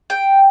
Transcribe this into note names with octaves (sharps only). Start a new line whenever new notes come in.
G5